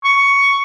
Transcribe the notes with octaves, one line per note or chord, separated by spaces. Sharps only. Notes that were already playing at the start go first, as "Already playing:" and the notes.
C#6